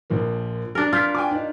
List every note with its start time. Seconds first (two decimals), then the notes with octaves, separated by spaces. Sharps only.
0.10 A#1 F3 A#3
0.75 D4 A#4
0.93 F4 F6 G6 B6
1.15 G5 G#5 D6
1.31 D4 D#4